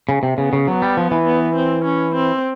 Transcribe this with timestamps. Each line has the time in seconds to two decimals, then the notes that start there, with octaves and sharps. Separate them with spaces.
0.09 C#3
0.23 C3
0.37 C#3 B3
0.53 C#3
0.68 F#3 B3
0.82 G3
0.97 F3
1.11 E3
1.26 B3
1.56 C4
1.85 C#4
2.15 C4